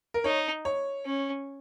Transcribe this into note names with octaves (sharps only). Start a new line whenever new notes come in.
A#4
D#4 C#5
C#5
C#4